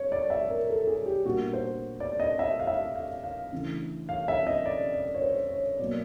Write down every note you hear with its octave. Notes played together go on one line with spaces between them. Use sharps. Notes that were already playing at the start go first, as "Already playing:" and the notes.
Already playing: C#5
D5
E5
A#4
A4
G#4
G4
A#2 G3 B3 D4 F#4
C5
D5
D#5
E5
F5
E5
F5
F5
C#3 E3 A3 D4
F5
E5
D#5
D5
D5
C#5
C5
C#5
B2 F#3 A#3 D5